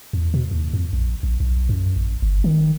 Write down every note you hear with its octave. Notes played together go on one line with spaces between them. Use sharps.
E2
B2
D#2
F2
A#1
A#1
B1
F#2
A1
G1
D#3